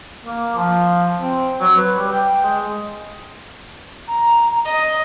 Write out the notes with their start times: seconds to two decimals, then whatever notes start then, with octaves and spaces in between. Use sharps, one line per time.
0.25 A#3
0.56 F3
1.21 C4
1.60 F#3
1.77 B4
1.97 G3
2.12 G5
2.43 G#3
4.08 A#5
4.65 D#5 D#6